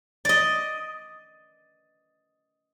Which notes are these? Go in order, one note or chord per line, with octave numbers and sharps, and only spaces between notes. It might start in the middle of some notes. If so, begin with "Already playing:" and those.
D5 D#5